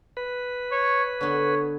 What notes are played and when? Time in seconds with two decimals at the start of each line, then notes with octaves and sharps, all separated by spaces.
0.17 B4
0.72 C#5
1.21 D3 B3 C#5